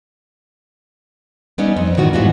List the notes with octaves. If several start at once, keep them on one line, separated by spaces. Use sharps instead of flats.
G3 B3 C#4 D#4
F2
A2 D#3 E3 F#4
G#2 E3 G3 B3 F4 F#4